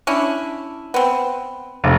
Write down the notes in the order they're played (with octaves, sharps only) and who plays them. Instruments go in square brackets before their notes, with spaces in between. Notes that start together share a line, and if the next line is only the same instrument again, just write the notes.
[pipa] C#4 D4 E4
B3 C4
[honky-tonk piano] F1